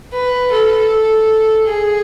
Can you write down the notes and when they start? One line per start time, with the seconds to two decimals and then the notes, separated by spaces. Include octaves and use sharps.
0.13 B4
0.52 A4
1.67 G#4